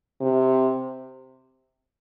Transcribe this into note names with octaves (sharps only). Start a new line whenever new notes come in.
C3